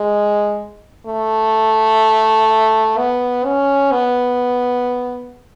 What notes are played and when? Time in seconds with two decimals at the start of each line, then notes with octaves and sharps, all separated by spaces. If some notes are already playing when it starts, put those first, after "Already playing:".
Already playing: G#3
1.06 A3
2.97 B3
3.45 C#4
3.92 B3